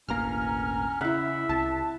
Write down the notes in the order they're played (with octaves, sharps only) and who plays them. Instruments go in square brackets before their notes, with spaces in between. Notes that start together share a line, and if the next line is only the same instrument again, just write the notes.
[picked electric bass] E1 A1 A#3 [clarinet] C#4 [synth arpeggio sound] A#5 F6
[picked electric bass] C#3 [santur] E4 F#5 [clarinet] E5
[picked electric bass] C2 [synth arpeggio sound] A5